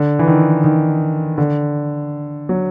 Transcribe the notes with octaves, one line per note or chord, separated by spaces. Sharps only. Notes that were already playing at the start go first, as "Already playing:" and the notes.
Already playing: D3
E3
D#3
D#3
D3
F#3